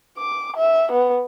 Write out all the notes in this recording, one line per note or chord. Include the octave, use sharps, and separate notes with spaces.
D6
E5
B3